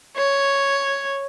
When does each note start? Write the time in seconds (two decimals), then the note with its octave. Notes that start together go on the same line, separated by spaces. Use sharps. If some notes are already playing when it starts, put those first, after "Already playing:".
0.17 C#5